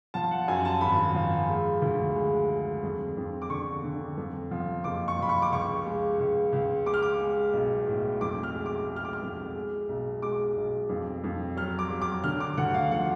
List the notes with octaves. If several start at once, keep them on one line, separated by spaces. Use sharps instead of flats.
F3 A5
F#5
F#2 G#5
A5
G#1 B5
F3
G#3
D2
G#3
G#3
F2
F2
D6
D3 C#6
D3
F2
F3
F#1 D6
C#6
F3 B5
C#6
D6
C#2 C#6
G#3
C#2
C#2
G#3 D6
F6
D6
G#3
B1
A2
F2 D6
F6
G#3
D6
G#3
F6
D6
F6
F2
G#3
B1
G#3 D6
B1
F2
F2
F#3 F6
D6
F#3
D6
D3 F6
D6
D2 F#5
F5
F3 F#5